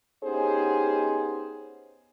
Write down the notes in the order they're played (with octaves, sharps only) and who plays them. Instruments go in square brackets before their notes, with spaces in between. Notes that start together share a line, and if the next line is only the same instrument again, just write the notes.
[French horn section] B3 C#4 D#4 G4 G#4 C5